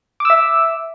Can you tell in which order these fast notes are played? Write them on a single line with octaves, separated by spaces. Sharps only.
D6 E6 E5